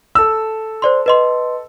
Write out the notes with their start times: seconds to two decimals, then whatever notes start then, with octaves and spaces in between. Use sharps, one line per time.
0.15 A4 E6
0.82 C5 D5 C6
1.06 B4 D#5 C6